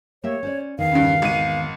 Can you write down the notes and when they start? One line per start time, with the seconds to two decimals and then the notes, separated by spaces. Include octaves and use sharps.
0.24 A#3 G4 C#5 E5
0.43 C#4 C5 D5
0.79 E2 D#3 F5
0.92 G2 C#3
1.22 G#1 D#7